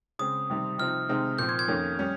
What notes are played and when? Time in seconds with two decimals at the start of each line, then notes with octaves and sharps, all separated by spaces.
0.19 C#3 G#3 C4 D#6
0.50 C3 D#3 G3 C4
0.78 C3 F3 C4 D#4 F6
1.09 C3 D#3 G#3 C4 D#4
1.39 A#2 F3 C4 G6
1.49 G#6
1.59 G#6
1.68 F2 D#3 A#3 C#4
1.99 G3 C#4